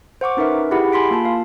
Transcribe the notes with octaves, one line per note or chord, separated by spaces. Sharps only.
C5 F#5 C#6 D6
C#4 D#4 A#4 B4 E5
E4 G4 G#4 F#5 B5
G#5 B5 C6 B6 D7
A#3 F4 A5
F5